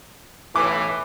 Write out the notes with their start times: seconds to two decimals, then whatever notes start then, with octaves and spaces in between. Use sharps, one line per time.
0.56 B1 A2 E3 D6